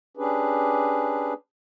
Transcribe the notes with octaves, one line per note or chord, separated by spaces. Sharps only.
C#4 D4 G4 G#4 B4